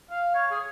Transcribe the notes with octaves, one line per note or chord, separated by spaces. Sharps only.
F5
C#5
G#4